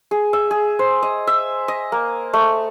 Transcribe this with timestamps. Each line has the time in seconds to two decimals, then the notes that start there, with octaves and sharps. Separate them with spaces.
0.11 G#4
0.33 E5
0.51 G#4
0.79 C5
1.03 D#5
1.27 E5
1.68 D#5
1.92 A#3
2.33 A3